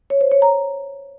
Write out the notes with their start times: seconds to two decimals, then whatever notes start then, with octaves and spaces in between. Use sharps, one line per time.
0.10 C#5
0.21 C5
0.31 C#5
0.42 A#5